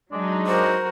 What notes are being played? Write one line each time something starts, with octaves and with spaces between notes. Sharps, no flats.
F#3 G#3 D4 D#4
F#4 A#4 C5